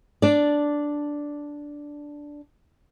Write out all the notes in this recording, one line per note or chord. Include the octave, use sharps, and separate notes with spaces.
D4 D5